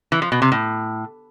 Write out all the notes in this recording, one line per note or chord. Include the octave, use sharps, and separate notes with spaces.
E3
F3
B2
C3
A2